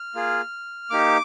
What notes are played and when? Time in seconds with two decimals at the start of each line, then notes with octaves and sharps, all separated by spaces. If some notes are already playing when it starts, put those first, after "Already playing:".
Already playing: F6
0.15 A#3 F4 G#4
0.90 A#3 D#4 G4 D6